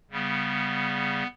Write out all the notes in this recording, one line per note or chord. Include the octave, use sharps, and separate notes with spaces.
C#3 G3 B3